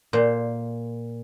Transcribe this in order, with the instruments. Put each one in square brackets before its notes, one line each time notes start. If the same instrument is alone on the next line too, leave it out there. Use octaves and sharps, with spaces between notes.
[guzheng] A#2 C5